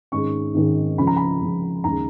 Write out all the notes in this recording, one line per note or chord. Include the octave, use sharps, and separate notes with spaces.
G#1 G#2 D#3 G#3 C#4 C#6
G#1 G#2 D#3 G#3 C#4
C#2 C#3 F3 B5
A#5
B5
C#2 C#3 F3
D#2 C#3 G#3 A#5